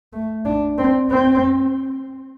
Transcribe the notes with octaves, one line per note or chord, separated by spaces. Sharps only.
A3
D4
C4
C4